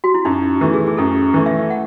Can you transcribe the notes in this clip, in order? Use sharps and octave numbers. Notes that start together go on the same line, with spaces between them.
F#4
E4
F#2 D#4
E3 A3
G#4
G#4
F#2 A4
E3 A3
E5
F#5